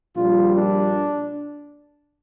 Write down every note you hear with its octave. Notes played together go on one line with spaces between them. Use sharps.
A#1 A#2 G3 F4
D4